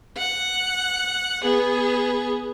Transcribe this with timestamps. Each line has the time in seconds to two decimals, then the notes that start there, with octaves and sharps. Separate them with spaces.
0.18 F#5
1.42 B3 G#4